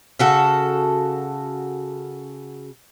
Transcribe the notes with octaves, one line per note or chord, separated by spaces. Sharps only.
C#3 F#4 A4